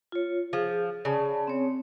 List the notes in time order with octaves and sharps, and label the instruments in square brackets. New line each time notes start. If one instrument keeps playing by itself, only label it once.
[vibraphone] F4 C#5
[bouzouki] F3 [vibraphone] G#4
[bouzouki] C#3 [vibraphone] D5 A5
[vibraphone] C4 C#5